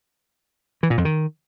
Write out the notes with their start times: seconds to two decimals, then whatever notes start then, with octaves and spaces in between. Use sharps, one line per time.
0.83 E3
0.90 A#2
0.98 F2
1.05 D#3